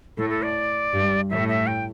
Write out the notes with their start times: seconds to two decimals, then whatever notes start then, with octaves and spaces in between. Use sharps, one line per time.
0.17 A2 A4
0.30 A4
0.43 D5
0.93 G2
1.30 A2 E5
1.48 E5
1.67 G5